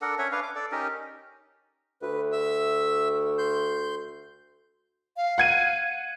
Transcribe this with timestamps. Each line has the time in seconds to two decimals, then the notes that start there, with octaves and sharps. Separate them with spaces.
0.02 D4 A4 A#4 F#5
0.18 C#4 C#5 E5 F#5
0.32 D4 B4 F5
0.43 D6
0.55 A4 D5
0.72 C#4 D#4 G4 A#4
2.02 D2 B4
2.32 E5 E6
3.38 C6 G6
5.17 F5
5.38 F#5 G#6 D#7